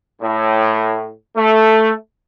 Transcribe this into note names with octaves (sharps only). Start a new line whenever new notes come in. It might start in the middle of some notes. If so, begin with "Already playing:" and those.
A2
A3